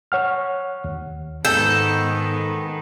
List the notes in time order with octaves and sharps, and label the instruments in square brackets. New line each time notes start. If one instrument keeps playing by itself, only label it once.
[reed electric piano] C#5 F#5 F6
D#2
[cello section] G#2 D#3 B3 [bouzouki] A4 [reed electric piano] G6